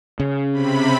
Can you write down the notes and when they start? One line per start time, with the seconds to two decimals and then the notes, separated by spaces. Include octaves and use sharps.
0.20 C#3
0.52 C3 B5